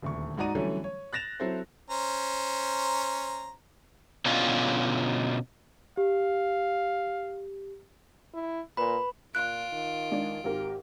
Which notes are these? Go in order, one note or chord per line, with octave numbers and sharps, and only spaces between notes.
D#1 D2 C#6
G#2 D#4 F#4 D5 A#5 D#7
D3 E3 F#3 G3 A3 C#4
C#5
F#6 A6 A#6 E7 F7
F#3 C4 E4 A4 C5
C#4 C5 A#5
B2 D3 C#4 F4
G4 F5
E4
A#2 B4 B5
A#2 F4 F#6 D7
D#3
G#3 D4
G#1 G4 A#4